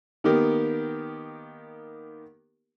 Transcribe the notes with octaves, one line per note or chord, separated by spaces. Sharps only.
D#3 A#3 B3 G4 A#4